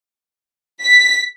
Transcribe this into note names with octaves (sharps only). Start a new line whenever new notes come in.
B6